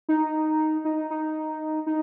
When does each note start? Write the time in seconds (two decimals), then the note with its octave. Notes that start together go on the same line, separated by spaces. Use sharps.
0.09 D#4
0.85 D#4
1.10 D#4
1.87 D#4